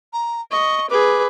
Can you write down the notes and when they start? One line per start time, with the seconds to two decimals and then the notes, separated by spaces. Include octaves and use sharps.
0.13 A#5
0.52 D#5 C#6
0.90 G#4 B4 D6